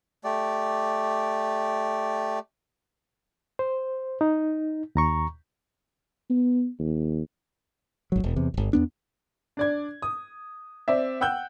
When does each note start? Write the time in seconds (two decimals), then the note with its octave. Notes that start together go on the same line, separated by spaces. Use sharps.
0.24 A3 G4 D5
3.59 C5
4.21 D#4
4.95 D#2 A#5 C#6
6.30 B3
6.79 D#2
8.12 G#1 F#3
8.24 E1
8.36 E2 C3
8.54 D1 G1
8.73 E2 B3 D4
9.57 D4 D5 G#6
10.02 D#6
10.88 C4 D5 E5
11.21 F#5 G5 E6 F#6 G6